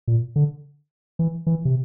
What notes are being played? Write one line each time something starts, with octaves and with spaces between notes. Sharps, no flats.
A#2
D3
E3
E3
C3